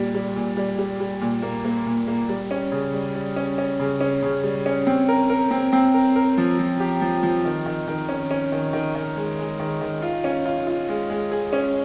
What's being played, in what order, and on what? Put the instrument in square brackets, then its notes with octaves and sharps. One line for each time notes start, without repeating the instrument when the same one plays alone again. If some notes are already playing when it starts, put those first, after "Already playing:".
Already playing: [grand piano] A#2 G3
G3
A#2
G3
G3
G3
A#2
A#3
A#3
A#2
A#3
G3
C#4
C#3
G3
G3
C#4
C#4
C#3
C#4
C#3
G3
C#4
C4
A#4
A#4
C4
C4
A#4
A#4
F3
F3
G4
F3
F3
D#3
D#3
D#3
C#4
C#4
D#3
D#3
D#3
G#3
G#3
D#3
D#3
F4
C#4
F4
F4
G#3
G#3
G#4
C#4